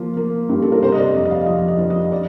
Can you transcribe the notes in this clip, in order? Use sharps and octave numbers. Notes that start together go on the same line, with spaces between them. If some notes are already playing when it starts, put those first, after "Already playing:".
Already playing: F3 A#3 F4
A#3
G2
A4
A#4
C3 C5
D#5
D5
F2 D#5
D#5
F5
F3 D#5
D#5
F3
D#5
D5